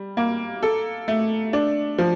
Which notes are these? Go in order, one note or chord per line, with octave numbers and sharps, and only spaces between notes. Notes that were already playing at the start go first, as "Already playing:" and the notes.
Already playing: G3
A#3
A4
A3
D4
F3